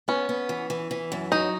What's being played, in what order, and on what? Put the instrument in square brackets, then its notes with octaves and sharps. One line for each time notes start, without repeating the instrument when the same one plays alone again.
[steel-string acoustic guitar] B3 [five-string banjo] C#4
[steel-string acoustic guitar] B3
E3
E3
E3
F#2
[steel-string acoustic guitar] F#3 [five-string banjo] D#4